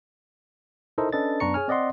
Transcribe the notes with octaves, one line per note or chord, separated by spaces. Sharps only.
D#4 E4 A4 A#4 C5 D#5
C#4 D4 A4 B4 D#5 A6
F#2 B3 D4 A#5 C#6 C#7
G#4 C#5 G#5 F6
C4 D5 D#5 F#5 C6